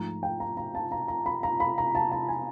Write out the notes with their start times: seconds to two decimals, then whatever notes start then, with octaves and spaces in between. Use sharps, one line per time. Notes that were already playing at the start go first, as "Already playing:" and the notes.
Already playing: G#2 F3 A3 A#5
0.23 G5
0.40 A#5
0.57 A#5
0.75 A5
0.92 A#5
1.08 A#5
1.26 B5
1.43 A#5
1.60 B5
1.78 A#5
1.95 A5
2.12 A5
2.28 G#5